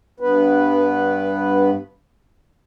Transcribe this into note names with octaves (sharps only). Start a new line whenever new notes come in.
G2 B3 B4